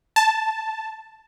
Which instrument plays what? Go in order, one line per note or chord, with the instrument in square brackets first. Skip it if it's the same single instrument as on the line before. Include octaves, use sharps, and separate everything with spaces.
[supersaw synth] A5